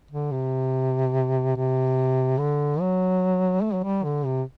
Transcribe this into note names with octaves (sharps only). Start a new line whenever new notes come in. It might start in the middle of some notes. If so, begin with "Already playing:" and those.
D3
C3
C3
D3
F#3
A3
F#3
G3
D3
C3